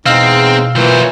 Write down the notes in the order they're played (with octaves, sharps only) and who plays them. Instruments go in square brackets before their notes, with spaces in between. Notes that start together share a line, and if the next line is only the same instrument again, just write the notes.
[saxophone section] E2 G#3 D#4 [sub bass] B2 [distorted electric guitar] C4 [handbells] F5 E6 F6
[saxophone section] A#2 E3 [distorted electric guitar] F#3 C5